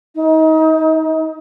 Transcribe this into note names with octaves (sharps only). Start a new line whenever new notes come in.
D#4